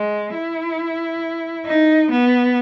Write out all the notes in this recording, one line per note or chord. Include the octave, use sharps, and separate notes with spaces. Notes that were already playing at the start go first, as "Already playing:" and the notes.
Already playing: G#3
E4
D#4
B3